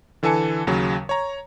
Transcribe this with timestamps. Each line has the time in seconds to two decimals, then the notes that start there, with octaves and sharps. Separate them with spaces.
0.23 D3 E3 A4 G#5 A5 C#7
0.67 D#2 C#3 F#3
1.09 C#5 A#5